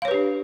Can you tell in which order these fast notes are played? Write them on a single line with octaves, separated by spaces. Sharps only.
F5 C#5 B4 G4 D4